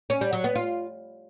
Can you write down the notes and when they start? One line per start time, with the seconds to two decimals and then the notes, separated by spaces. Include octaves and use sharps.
0.10 C#4
0.21 G3
0.33 F#3
0.44 B3
0.55 F4